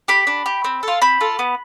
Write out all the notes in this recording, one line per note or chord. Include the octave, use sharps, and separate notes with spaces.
G4 B5
D4
G4
C4
F4 A4
C4 B5
F4 A4
B3